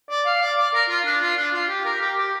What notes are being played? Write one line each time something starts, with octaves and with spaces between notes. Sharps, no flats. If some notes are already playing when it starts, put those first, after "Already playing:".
D5
F5
D5
D5
A#4
F4
D4
F4
D4
F4
G4
A#4
G4
G4